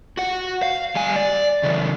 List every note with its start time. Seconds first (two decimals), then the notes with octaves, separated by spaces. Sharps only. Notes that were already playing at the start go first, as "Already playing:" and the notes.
0.17 F#4 F#5
0.63 F5
0.96 G3 G#5
1.16 D5
1.63 C#3 E3